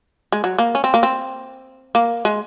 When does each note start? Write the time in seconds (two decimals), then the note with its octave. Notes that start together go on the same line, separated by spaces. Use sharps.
0.32 G#3
0.44 F#3
0.59 A#3
0.75 C#4
0.84 C4
0.94 A#3
1.03 C4
1.95 A#3
2.25 G#3